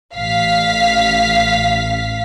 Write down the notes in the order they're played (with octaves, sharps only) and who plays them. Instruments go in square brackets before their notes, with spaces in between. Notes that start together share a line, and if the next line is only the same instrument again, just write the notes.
[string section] A1 F5 B6